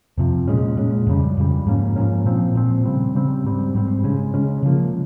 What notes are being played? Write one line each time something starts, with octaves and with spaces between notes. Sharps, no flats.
F2 C3 F3
A#2 G#3 C#4
A#2 G#3 C#4
F2 C#3 G3
F2 C#3 G3
G#2 F3 A#3 C#4
G#2 F3 A#3 C#4
A#2 F3 C4
A#2 F3 C4
C#3 G3 C4
C#3 G3 C4
G#2 G3 C4
G#2 G3 C4
C#3 G#3 C#4
C#3 G#3 C#4
C#3 F3 A#3